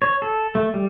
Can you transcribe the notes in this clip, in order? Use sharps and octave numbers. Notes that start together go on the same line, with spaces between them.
C#5
A4
A3
G3